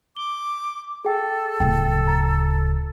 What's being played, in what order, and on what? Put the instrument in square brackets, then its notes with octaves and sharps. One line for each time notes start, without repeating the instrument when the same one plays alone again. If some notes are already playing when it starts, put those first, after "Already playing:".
[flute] D6 [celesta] G7
[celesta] G#4 G5 [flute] A4
[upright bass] D1 C#3 [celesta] G5
[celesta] A#5 A6